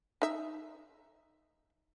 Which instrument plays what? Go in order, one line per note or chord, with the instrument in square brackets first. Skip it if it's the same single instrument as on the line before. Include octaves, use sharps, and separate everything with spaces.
[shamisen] D#4 E5